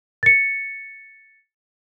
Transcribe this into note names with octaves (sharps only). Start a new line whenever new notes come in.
A6 C#7